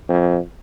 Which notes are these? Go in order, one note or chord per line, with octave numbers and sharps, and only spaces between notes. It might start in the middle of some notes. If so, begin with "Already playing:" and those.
F2